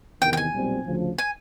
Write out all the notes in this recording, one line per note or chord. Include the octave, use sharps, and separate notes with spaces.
E2 C3 D#3 G5
G5
G#5
B1 A#2 G3 C4
D2 C#3 F3
G#5